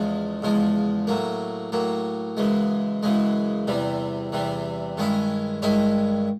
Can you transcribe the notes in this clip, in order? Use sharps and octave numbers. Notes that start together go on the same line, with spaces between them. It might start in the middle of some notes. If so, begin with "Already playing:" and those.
Already playing: E2 C#3 F3 G#3
E2 C#3 F3 G#3
A2 F#3 A#3
A2 F#3 A#3
F#2 C#3 E3 G#3
F#2 C#3 E3 G#3
E2 C3 E3 G3
E2 C3 E3 G3
G2 D#3 G#3 C#4 E4
G2 D#3 G#3 C#4 E4